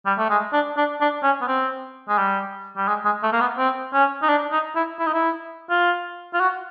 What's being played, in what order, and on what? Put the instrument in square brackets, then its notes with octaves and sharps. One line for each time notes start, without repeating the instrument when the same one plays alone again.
[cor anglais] G3
A3
G#3
D4
D4
D4
C#4
B3
C4
G#3
G3
G3
G#3
G#3
A3
A#3
B3
C4
C#4
D#4
D4
D#4
E4
E4
D#4
E4
F4
F4
F#4